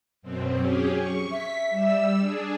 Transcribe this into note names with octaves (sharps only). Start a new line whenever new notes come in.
F#2 B2 C4
F#3 C#4 G4 G#4
C#6
E5 B6
G3 E6
D4 G#4